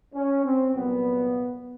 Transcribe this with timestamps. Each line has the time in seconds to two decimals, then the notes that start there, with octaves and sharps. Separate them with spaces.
0.14 C#4
0.45 C4
0.74 C2 A#2 F#3 B3